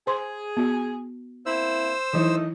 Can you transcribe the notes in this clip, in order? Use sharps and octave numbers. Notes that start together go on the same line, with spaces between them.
G#4 C5 C6
B3 F#4
A#3 C4 E4 C5 E6
D#3 E3 F#3 A3 D#4 E4